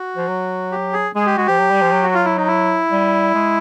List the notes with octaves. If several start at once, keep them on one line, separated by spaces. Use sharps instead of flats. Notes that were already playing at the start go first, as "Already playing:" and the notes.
Already playing: F#4
F3
F#3
G4
G#4
G#3 G#4
G4
G#3 F#4
F3 G4
F#3
G3
F3
F#3
F#4
F4
E4
D#4
E4
G3
G#3